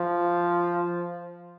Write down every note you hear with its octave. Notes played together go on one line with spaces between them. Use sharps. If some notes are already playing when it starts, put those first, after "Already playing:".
Already playing: F3